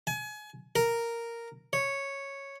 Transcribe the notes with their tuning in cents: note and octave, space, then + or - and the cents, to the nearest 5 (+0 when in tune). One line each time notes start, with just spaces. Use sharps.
G#5 +30
A#4 -5
C#5 -5